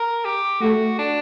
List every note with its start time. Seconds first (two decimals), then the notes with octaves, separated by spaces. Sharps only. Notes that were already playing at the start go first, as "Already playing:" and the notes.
Already playing: A#4
0.25 G4
0.62 A3 F#4
0.99 D4